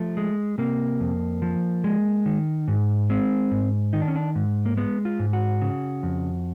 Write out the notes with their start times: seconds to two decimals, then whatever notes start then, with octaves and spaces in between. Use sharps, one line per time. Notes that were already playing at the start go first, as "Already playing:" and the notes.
Already playing: F3 A3
0.17 G#3
0.58 C3 A#3
1.00 F2
1.42 F3
1.84 G#3
2.26 D#3
2.68 G#2
3.10 G#3 C4
3.51 G#2
3.93 D#3 D#4
4.01 D4
4.08 C#4
4.16 D4
4.35 G#2
4.66 A#3
4.77 G#3 B3
5.05 F4
5.19 G#2
5.33 F#4
5.61 C#3
6.03 F2